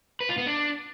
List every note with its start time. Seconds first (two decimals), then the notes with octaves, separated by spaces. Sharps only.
0.20 B4
0.29 F4
0.38 B3
0.46 D4